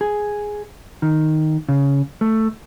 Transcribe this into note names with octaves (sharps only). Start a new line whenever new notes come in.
G#4
D#3
C#3
A3